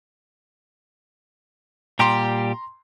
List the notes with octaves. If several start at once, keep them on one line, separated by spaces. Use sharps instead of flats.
A#2 G3 G4 A#5 C6